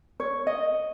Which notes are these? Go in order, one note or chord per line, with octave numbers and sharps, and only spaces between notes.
C#5
D#5